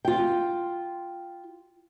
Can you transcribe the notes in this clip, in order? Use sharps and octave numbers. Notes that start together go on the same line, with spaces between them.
F4 G5